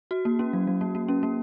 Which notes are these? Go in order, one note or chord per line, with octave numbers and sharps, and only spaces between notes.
F#4
A#3
C#4
F#3
F#3
A#3
A#3
C#4
A#3